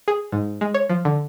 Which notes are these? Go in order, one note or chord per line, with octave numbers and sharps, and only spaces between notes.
G#4
G#2
G#3
C#5
F3
D3